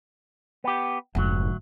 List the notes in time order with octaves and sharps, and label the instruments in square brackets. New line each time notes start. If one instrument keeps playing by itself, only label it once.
[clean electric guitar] B3 G4
[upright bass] F1 G#2 [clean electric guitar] D2 F#3